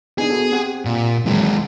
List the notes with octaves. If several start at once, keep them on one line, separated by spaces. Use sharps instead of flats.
B3 D4 D#4 G#4
B3 F#4 A4
C4 G4 F#5
A#2
D#2 E3 F#3 G#3 C4